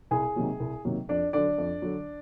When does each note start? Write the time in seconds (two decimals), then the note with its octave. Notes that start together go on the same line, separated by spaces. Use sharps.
0.11 C2 G#4 G#5
0.36 C3 D#3 F#3 A#3
0.60 C2
0.85 C3 D#3 F#3 A#3
1.09 F2 D4 D5
1.33 D3 F#3 D4 D5
1.58 F2
1.82 D3 F#3